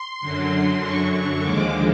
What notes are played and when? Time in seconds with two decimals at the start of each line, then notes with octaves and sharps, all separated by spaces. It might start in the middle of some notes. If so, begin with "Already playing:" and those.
Already playing: C6
0.21 F#2 D3 F#3
0.81 C#6
1.41 D#2 D3 F3 G#3 D6